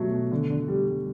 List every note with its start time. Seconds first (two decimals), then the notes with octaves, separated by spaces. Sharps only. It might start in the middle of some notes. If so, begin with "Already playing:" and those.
Already playing: B2 F#3 A3
0.12 B2
0.32 D3
0.50 D3
0.68 G3
0.87 G3